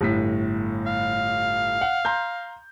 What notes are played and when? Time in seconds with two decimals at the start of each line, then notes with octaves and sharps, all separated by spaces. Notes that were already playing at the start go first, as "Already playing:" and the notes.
0.01 G1 A2 B6
0.86 F5
1.81 F#5
2.05 A#5 C6 G6